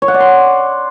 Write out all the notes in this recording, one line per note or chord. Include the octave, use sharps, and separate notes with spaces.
C#5
F#5
D5
C6